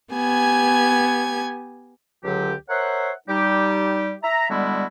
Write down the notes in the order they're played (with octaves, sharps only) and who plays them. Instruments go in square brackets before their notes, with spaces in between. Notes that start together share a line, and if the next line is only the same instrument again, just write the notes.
[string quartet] B3 G4 G#5 G#6
[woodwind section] C#2 D3 F#3 G4
A#4 C5 C#5 E5 F#5
G3 D#4 G4
E5 A#5
D3 G3 G#3 B3 E4 F#4